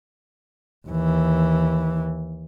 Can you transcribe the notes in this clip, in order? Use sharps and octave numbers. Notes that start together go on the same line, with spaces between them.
D#2 E3